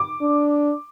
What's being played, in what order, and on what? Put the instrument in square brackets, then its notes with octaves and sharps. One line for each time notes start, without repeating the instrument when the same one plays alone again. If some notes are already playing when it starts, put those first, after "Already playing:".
Already playing: [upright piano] D6
[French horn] D4